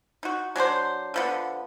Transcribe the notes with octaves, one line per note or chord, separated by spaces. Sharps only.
D#4 F#4
F#3 D4 G#4 C5
D3 F3 B3